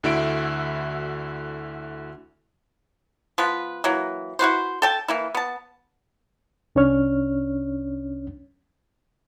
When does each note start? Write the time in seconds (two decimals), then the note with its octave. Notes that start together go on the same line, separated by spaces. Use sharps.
0.03 D2 D3 E4 F#4 E5 D7
3.38 F3 B3 B4
3.84 E3 F#3 A#3
4.39 E4 F#4 B4 C5
4.82 A4 G5 A5
5.08 E3 A#3 E4
5.35 B3 A5
6.75 C2 C#4 D4 C#5 F6